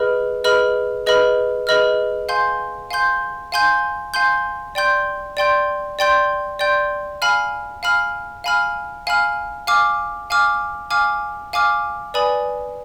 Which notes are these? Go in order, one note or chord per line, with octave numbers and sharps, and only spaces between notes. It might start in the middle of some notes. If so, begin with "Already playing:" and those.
Already playing: G#4 B4 D#5 B5 F6
G#4 B4 D#5 B5 F6
G#4 B4 D#5 B5 F6
G#4 B4 D#5 B5 F6
F5 G#5 C6 G6
F5 G#5 C6 G6
F5 G#5 C6 G6
F5 G#5 C6 G6
D5 G5 C6 G6
D5 G5 C6 G6
D5 G5 C6 G6
D5 G5 C6 G6
F5 G#5 B5 F6
F5 G#5 B5 F6
F5 G#5 B5 F6
F5 G#5 B5 F6
F5 G#5 D6 F6
F5 G#5 D6 F6
F5 G#5 D6 F6
F5 G#5 D6 F6
B4 D5 G#5 B5 D#6